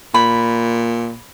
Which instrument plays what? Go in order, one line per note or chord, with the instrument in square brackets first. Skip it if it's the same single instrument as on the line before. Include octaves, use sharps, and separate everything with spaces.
[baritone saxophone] A#2 [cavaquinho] B5